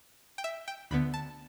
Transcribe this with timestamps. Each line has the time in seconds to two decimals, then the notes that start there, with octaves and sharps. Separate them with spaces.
0.38 G5
0.44 E5
0.68 G5
0.91 D2 D3 B3 B5
1.14 A5